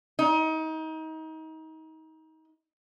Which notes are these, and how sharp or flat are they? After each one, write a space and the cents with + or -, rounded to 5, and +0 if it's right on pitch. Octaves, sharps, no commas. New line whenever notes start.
D#4 +30